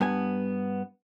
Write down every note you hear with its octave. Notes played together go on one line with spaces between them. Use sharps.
G2 B3 G#5